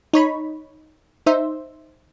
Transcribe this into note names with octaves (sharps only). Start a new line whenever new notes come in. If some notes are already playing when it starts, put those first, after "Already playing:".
D#4 C#5 B5
D#4 C5 E5